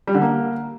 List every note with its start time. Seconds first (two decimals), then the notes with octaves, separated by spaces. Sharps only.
0.07 G3
0.14 D3
0.21 A#3